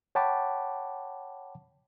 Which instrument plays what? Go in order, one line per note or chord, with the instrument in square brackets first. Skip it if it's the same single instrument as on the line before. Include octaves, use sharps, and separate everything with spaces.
[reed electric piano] C#5 F#5 G5 A5 B5 D6